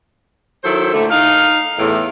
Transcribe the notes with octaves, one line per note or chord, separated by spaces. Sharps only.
D#3 F#3 E4 A4 C5
A#2 D3 A3
D#4 F5
E2 A2